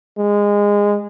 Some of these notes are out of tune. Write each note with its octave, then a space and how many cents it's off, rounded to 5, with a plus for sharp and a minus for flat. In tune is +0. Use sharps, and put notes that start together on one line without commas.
G#3 -20